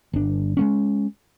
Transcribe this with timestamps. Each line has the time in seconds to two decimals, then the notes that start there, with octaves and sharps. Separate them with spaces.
0.13 G1 D4
0.57 G#3 A3 C#4